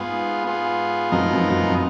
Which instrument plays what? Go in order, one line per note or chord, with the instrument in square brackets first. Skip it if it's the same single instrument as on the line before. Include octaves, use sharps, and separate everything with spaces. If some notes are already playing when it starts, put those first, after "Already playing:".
Already playing: [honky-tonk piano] G#2 [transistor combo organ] B3 F4 G#4
[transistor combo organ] B3 F4 G#4
[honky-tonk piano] F#2 [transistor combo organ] F3 B3 D#4 A#4 D#5
[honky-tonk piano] F#2
F#2
F2